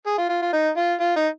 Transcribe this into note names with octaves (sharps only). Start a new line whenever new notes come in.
G#4
F4
F4
F4
D#4
F4
F4
D#4